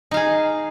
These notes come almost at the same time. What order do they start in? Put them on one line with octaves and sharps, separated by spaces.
D#4 F5 G#4